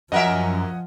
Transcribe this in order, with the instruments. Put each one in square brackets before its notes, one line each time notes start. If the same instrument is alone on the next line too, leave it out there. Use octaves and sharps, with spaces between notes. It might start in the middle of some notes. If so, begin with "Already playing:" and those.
[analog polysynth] F#2 [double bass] F3 [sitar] C#4 A#4 E5 [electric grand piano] D#5 F#5 G#5